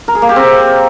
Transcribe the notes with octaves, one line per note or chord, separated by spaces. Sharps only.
A#4
G#4
A#3
G4
C4